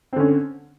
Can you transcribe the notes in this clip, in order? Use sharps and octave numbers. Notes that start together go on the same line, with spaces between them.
D3 C4 C#4